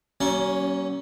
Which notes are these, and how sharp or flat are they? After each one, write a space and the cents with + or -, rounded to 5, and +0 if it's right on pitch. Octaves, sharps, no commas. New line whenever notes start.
F#3 +40 A#3 +20 C#4 +0